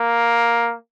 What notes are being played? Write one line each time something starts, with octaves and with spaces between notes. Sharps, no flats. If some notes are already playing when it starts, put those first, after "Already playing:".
Already playing: A#3